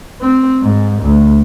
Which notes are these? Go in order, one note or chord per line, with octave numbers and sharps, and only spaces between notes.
C4
G#2
D2